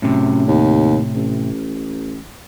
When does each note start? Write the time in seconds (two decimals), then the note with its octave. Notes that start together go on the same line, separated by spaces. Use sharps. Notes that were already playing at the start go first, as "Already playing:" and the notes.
0.02 F#2 A2 C3
0.47 D#2
1.15 A1